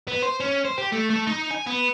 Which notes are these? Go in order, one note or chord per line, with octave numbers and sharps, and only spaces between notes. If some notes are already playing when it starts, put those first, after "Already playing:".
B3
C5
C#4
C5
G4
A3
A3
D#4
G#5
B3